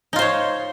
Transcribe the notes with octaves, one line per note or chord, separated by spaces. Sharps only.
D#4 F4 C5 C#5